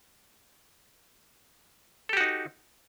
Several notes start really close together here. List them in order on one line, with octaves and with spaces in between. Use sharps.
A4 G4 F#4 D#4